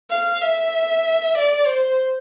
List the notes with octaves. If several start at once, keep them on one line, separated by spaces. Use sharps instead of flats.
F5
E5
D5
C5